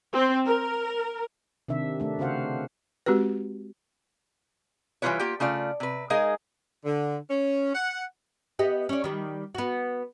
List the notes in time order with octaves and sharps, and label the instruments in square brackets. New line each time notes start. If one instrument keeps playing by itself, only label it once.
[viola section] C4
A#4
[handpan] C3 D#3 D4 E5
A3 D4
C#3 C4 F#4 C5 F5 F#5
[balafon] G#3 C4 F#4 G4 B4
[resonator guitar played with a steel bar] E3 G3 E4 F4 B4 C#5
A#3 F4 G4 G5
C#3 A3 F4 D5
C3 B4
G#3 D#4 G#4 A#4 D#5 F5
[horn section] D3
C#4
F#5
[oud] B3 G4 D#5
C#4 D5
D#3 G3
B3 F#4